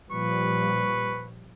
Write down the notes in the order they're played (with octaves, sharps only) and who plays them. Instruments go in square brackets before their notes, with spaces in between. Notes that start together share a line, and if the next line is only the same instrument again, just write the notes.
[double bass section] A#2 F3 G3 [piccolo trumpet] B4 [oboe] C#6